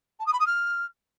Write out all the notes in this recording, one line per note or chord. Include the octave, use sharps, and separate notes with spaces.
A5
D#6
B5
D#6
F6